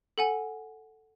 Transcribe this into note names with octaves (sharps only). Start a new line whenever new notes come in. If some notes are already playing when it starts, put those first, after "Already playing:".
A4 F#5 G#5